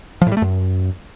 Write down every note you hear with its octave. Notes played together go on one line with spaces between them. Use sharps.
F3
A2
G3
A3
F#2